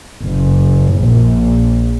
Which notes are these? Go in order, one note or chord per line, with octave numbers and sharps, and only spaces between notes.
F#1
A#1